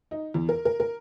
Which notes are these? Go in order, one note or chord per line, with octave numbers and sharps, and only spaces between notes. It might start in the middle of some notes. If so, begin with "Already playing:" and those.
D#4
E2
A#4
A#4
A#4